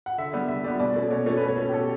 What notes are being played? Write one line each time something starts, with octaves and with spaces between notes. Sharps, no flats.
F#5
D3 E5
G3 B3
D3 E5
G3 B3 D5
B2 D5
A3 C#4
B2 C#5
A3 C#4 C#5
B2 B4
C#5
A3 C#4
G4
B2 A4